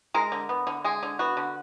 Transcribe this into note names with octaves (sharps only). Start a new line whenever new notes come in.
G#3 A#4
D3
B3
D3
G#3 G#4
D3
B3 F#4
D3